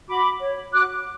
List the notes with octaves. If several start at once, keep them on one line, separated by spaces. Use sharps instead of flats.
F#4 B5 D6
C#5
F#4 D6 F#6